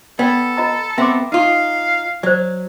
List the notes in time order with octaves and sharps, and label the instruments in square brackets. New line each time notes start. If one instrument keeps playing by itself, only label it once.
[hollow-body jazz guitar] B3 [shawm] A4 [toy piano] D5 G5
[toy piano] F4 D#5 A#5
[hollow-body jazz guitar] B3 C4 [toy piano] E5 C6 D6
[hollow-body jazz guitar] D#4 F4 [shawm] F5
[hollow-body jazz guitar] F#3 [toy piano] C5 D5